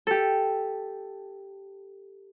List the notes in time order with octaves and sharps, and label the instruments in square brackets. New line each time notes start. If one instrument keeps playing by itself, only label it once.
[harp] G4 A4